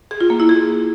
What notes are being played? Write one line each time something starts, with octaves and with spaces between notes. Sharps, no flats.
G#4
F4
A#3
E4
G#4